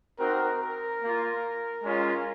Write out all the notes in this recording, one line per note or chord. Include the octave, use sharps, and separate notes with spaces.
C4 D#4 F#4 A#4
A#4
A#3 F4
G#3 C#4 F4